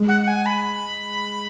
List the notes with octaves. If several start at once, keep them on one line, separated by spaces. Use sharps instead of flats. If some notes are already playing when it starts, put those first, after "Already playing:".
Already playing: G#3
F#5
F#5
G#5
B5